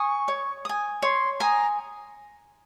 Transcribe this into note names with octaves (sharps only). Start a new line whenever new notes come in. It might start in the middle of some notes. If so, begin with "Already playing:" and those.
Already playing: G#5 C#6 D#6
C#5
G#5 D#6
C#5 C6
G#5 A#5 D#6